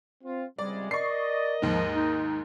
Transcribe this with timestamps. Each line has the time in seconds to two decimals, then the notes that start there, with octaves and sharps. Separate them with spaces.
0.24 C4 F4
0.58 C#2 C3 G3 G#3 D5
0.91 A#4 D5 D#5 C#6 C7
1.62 D#2 G#2 F3
1.96 D#4